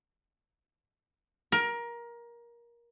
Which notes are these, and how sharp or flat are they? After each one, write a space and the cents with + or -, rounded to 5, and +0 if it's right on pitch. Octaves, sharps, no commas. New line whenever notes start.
A#4 +20